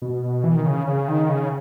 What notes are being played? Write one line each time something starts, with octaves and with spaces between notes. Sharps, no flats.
B2
E3
D#3
C#3
C#3
D#3
C#3